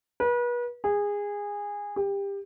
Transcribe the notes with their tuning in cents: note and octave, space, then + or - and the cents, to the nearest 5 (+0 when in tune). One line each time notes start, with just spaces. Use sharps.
B4 -35
G#4 -20
G4 +25